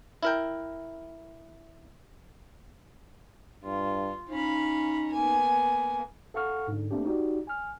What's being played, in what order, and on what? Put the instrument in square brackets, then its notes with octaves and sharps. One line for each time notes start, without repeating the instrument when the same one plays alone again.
[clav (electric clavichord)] E4 A#4 G5
[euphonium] G2 [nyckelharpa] F4
[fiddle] C#4 A#5 [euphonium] D#4 [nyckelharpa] F5 B5
[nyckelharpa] A#3 B3 [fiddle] G#5
[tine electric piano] A4 F5 F#5 C#6 F6
G#2 D3
A3 A#3 C4 D4 G4
D#4 F#4 G4 D5
G#5 F6